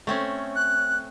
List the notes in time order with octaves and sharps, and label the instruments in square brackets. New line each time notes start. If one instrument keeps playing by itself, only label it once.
[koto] A3 C4 C#4
[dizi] F#6